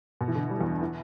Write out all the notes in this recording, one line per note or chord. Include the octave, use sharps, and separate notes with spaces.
B2
E3
D3
G3
E2
E3